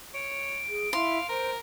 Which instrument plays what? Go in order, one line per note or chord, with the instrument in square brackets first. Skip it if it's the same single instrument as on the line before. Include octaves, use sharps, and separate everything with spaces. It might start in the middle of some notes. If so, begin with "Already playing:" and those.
[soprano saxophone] C#5 [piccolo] D7
[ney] G#4
[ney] E4 [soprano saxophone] F5 [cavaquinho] C6
[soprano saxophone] A#4 [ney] C5